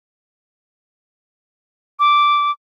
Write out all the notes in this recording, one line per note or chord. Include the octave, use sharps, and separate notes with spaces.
D6